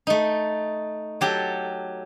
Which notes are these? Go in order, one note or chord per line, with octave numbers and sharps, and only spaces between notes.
A3 D#4
F#3 G4 A4